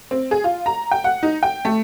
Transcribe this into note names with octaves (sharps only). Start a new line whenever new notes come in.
C4
G#4
F4
A#5
G5
F#5
D#4
G5
A3